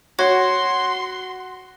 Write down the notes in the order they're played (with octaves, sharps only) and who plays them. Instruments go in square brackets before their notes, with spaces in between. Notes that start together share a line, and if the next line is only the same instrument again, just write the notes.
[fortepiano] F#4 [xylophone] C#5 G#6 [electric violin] C6